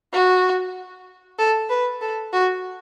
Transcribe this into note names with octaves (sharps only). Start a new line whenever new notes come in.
F#4
A4
B4
A4
F#4